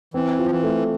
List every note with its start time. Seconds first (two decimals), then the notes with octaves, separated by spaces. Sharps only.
0.14 E3 C4
0.39 F4
0.46 F3
0.51 E3
0.63 A3